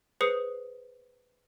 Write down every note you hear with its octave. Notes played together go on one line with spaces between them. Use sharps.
G#4 B4 C5 D#6 C7 C#7